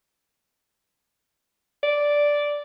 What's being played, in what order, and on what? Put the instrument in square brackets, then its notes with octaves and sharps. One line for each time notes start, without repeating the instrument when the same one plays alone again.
[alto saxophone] D5